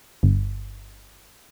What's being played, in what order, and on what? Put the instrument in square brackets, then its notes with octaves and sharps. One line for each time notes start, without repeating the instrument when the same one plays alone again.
[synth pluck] G1